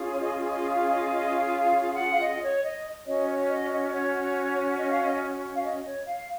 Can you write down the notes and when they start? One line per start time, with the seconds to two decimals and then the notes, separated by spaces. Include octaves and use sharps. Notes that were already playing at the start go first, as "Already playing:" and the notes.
Already playing: C#4 F4 G#4
0.13 C#5
0.21 D#5
0.50 D#5
0.70 F5
0.92 D#5
1.14 D#5
1.36 F5
1.64 F5
1.93 F#5
2.11 F5
2.20 D#5
2.42 C#5
2.64 D#5
3.06 C#4 F#4 C#5 D#5
3.28 C#5
3.49 D#5
3.70 D#5
3.92 C#5
4.77 D#5
4.90 F5
5.04 D#5
5.56 F5
5.64 D#5
5.85 C#5
6.06 F5